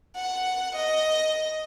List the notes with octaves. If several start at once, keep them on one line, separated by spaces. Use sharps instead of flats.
F#5
D#5